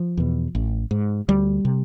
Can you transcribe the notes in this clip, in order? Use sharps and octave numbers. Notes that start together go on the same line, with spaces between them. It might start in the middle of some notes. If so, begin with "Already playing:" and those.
Already playing: F3
E2 B2
A1
G#2
D2 G3
C3